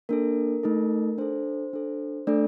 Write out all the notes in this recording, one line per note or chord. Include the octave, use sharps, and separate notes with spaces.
A#3 D4 A4 A#4
A3 D#4 A4
D4 A4 C5
D4 A4
A3 D4 A4 D5